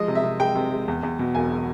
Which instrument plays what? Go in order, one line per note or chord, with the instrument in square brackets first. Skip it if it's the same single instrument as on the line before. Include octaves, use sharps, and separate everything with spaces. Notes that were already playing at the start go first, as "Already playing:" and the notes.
Already playing: [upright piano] F3 G#3 D#5
C3
E5
C3
G#3 G5
C3
G#3
E2
E2
B2
E1 G#5